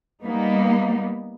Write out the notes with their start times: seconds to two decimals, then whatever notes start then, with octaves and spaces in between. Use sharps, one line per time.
0.24 G3 A#3 B3 D#4